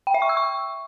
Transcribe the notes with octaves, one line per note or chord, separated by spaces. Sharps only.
G5
E5
C#6
E6
C#6